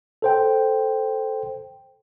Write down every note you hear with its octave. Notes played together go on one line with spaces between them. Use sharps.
A4 C5 G5